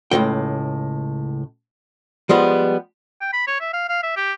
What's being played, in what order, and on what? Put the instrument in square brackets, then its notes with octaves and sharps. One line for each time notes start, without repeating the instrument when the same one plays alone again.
[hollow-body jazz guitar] C#2 A2 C3 G5
F3 G3 G#3 B3
[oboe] G5
B5
C#5
E5
F5
F5
E5
G4